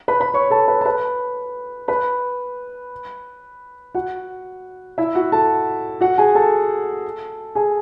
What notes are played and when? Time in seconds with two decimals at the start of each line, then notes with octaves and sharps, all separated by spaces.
0.08 B4 B5
0.20 B4 B5
0.34 C#5 C#6
0.50 A4 A5
0.68 B4 B5
0.81 A5
0.85 B4 B5
1.88 B4 B5
3.95 F#4 F#5
4.98 E4 E5
5.15 F#4 F#5
5.32 A4 A5
6.01 F#4 F#5
6.18 G#4 G#5
6.35 A4 A5
7.55 G#4 G#5